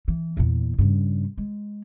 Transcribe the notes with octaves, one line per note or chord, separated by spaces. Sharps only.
E3
E2 A#2
G2 C#3
G#3